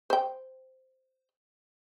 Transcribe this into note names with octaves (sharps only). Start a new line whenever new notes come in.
C5 G5